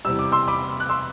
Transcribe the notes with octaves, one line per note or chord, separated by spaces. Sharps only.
E2 C3 G3 E6
D6
C6 E6
B5 D6
F#6
C6 E6